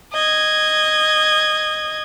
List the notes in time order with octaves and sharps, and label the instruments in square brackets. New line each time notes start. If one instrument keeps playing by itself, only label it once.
[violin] D#5 G#6